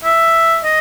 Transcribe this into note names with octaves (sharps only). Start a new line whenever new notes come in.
E5
D#5